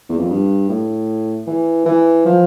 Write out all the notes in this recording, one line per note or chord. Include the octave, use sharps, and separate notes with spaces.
E2
F2
G2
A2
E3
E3
F3